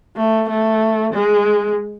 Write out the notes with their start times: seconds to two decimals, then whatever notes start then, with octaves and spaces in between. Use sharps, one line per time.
0.17 A3
0.49 A3
1.13 G#3